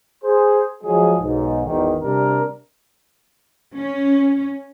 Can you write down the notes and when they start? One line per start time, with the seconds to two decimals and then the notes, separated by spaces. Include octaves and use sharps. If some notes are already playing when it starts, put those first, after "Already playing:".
0.23 G#4 C5
0.84 F3 F#3 G#3 G#4
1.19 B1 G#2
1.64 G#1 E2 D#3
2.01 C3 G3 D4 A#4
3.74 C#4